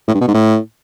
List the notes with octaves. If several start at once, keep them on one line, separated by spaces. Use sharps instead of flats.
A2
G2
B2
G#2
A2